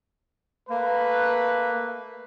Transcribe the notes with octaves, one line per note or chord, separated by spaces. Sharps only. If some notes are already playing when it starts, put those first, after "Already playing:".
A3 A#3 B4